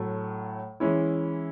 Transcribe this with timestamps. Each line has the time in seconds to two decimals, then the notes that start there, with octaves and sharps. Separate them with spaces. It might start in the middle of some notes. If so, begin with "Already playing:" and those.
Already playing: A2 F#3 A3
0.80 E3 G#3 C#4 E4